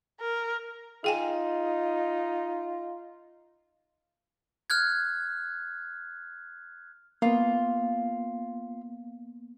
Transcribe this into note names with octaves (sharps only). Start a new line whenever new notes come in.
A#4
D#4 F4 G#4 G5 G#5
F6 F#6 G#6
A#3 B3 F4